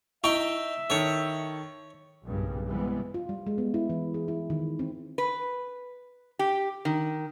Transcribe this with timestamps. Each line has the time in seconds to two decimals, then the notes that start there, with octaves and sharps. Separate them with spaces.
0.24 D#4 E4 E5 G5 C#6
0.90 D#3 A4 C#5
2.25 B1 G2 A#2 C#3 G3
2.67 C3 E3 G3 G#3 B3
3.14 F4
3.29 G3
3.47 G#3
3.58 B3
3.74 E4
3.90 E3
4.14 G#4
4.28 E4
4.50 D#3
4.79 C4
5.18 B4
6.39 G4
6.85 D#3